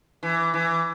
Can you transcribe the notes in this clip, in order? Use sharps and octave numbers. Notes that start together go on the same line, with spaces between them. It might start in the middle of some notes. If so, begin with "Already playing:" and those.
E3
E3